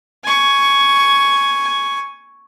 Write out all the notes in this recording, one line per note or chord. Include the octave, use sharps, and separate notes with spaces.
G#5 C#6